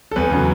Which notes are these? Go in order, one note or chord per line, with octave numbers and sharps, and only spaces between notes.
A4
E2 B4
C#3 F#3